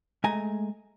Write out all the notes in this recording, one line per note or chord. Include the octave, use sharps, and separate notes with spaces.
G#3 A3 G#5 A#5